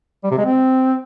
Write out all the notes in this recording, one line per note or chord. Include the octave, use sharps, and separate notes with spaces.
G3
C3
G#3
C4